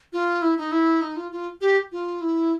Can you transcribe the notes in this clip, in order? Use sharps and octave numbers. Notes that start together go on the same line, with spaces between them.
F4
E4
D#4
E4
D#4
F4
F4
G4
F4
E4